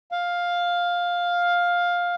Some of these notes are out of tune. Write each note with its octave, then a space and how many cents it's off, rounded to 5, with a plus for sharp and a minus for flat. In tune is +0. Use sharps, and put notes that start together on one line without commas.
F5 +10